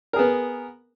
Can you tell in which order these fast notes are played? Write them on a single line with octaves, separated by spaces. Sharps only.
A#4 G#4 B3